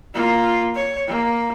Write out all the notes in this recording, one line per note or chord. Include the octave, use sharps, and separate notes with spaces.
A#3 F4
C#5
A#3